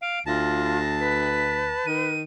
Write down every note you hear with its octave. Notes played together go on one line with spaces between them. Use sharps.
F5 D7
D2 F4 A5 A#6
B4 B6
D#3 D#7